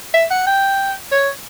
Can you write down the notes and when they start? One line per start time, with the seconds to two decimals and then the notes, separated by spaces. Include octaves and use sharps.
0.14 E5
0.31 F#5
0.47 G5
1.12 C#5